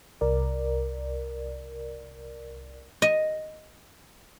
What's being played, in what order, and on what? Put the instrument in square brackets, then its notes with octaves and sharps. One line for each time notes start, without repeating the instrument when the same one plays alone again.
[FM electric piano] C2 A#4 D5
[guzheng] D#5